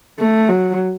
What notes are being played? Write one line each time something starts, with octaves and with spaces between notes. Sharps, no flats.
A3
F#3